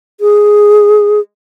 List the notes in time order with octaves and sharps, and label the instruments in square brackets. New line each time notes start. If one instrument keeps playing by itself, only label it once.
[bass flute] G#4